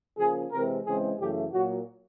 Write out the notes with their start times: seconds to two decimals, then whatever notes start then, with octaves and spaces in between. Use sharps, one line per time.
0.18 C#3 F3 A#3 G#4
0.52 C3 E3 G#3 C4 A#4
0.86 C#3 E3 G#3 C4 G#4
1.19 F#2 C#3 E3 A3 G4
1.53 A#2 F#3 A#3 F#4